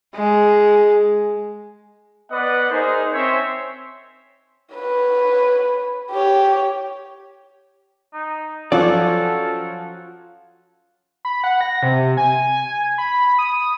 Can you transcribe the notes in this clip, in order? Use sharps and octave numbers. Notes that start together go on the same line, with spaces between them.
G#3
B3 B4 D5 D#5 F#5
D#4 G#4 A#4 C5
C4 C#4 C5 C#5 E5
B4 C#5
G4 C#5
D#4
F3 F#3 C#4 F4 F#4 A4 D5 F#5
B5
F#5
A#6
C3
G#5
B5
D#6